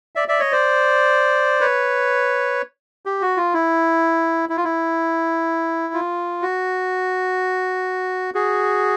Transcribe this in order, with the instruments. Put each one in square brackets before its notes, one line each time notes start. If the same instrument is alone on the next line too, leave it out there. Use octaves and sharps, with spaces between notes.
[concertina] D5 E5
D5 E5
C#5 D#5
C5 D5
B4 C#5
G4
F#4
F4
E4
E4
F4
E4
F4
F#4
F#4 G#4